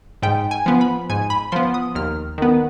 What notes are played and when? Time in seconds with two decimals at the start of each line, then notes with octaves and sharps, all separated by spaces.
0.23 G#2 G5
0.51 G#5
0.66 F3 B3
0.81 B5
1.09 G#2 G#5
1.30 B5
1.52 F3 B3 C6
1.74 D#6
1.95 D#2 F6
2.38 D#3 B3